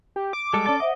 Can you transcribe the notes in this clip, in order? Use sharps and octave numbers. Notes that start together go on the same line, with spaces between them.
G4
D6
G3 G#3 A4
C#4 A4 D5 A5
C5 D#5 E5 F#5